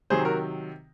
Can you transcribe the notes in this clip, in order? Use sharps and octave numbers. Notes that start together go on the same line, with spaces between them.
C3 D#3 F#3 G#4 C5
F#4 A#4